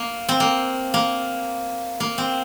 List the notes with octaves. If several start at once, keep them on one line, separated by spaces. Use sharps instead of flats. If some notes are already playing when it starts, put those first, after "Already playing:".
Already playing: A#3
C4
A#3
A#3
A#3
C4